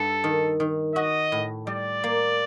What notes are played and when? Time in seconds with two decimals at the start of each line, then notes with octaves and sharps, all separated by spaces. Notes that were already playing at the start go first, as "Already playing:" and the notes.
Already playing: G2 A4
0.24 D#3
0.60 D#3
0.95 F#4 D#5
1.32 A2
1.67 G3 D5
2.04 A#3